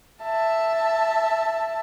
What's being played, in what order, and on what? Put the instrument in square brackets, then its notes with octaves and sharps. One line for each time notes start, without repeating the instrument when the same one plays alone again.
[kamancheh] E5 A5